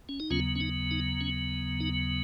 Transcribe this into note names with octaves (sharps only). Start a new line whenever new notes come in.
C#4
D#4
D#2 C#3 F#3 B3 C#4 F4
C#4
D#4
D#4
C#4
D#4